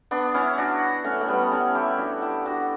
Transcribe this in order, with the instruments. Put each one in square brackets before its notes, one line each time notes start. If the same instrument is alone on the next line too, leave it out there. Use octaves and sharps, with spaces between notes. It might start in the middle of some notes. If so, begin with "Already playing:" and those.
[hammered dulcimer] B3 D4
C#4 E4
D4 F#4
A3 C#4
A3
G3 B3
A3 C#4
E4 G4
D4 F#4
E4 G4
D4 F#4